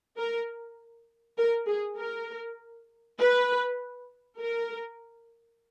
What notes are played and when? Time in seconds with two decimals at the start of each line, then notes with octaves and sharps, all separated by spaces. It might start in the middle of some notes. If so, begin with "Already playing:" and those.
0.17 A#4
1.38 A#4
1.67 G#4
1.98 A#4
3.19 B4
4.40 A#4